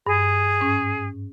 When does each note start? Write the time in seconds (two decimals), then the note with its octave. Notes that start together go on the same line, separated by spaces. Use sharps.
0.06 G2 G#4
0.61 G#2 C#4